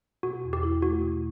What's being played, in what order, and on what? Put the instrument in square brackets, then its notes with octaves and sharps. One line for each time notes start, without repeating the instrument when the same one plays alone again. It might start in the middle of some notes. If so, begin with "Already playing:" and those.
[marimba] B2 [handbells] F#4
[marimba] E2
[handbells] G4
[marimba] E4
[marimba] A3 [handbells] F#4
[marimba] B2